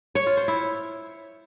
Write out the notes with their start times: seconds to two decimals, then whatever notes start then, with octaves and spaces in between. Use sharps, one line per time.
0.15 C#5
0.26 F4
0.37 C5
0.48 E4